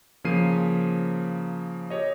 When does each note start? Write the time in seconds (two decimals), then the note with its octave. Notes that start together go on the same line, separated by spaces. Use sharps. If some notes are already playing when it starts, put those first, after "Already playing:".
0.24 C#3 F3 A#3 C7 D#7
1.90 G4 C#5 D#5